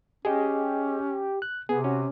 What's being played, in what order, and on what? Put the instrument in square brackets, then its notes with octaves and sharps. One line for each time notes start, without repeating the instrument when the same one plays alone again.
[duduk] C#4 [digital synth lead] G4 [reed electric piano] G#4 D#5
[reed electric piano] F#6
[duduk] C3 [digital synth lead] B3 [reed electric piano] G#4
[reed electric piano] C#4 [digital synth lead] F#4